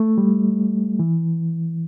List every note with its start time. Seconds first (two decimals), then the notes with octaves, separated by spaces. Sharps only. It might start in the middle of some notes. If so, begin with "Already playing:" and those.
Already playing: A3
0.18 G3
0.99 E3